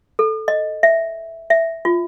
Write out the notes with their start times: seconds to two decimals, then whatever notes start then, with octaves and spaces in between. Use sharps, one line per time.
0.19 A4
0.48 D#5
0.83 E5
1.50 E5
1.85 F4